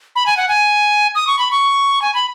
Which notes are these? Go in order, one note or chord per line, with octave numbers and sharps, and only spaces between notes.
B5
G#5
F#5
G#5
D#6
C#6
B5
C#6
G#5
B5